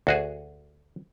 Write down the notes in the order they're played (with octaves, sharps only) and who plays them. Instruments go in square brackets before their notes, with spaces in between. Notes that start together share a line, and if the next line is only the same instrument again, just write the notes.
[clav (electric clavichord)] D2 F#4 G#4